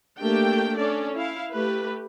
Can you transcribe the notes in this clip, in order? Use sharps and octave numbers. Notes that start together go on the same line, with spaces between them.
A3 A#3 D4 G4 G5
C#4 D4 A4 D5
E4 F5
A3 G4 B4